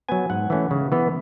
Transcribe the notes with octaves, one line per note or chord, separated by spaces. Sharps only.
F#3 B3 G#5
G#2 F#5
E3 A3 C#4
C#3
E3 B3